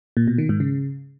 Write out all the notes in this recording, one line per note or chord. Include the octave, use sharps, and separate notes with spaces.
A#2
B2
D#3
G#2
C#3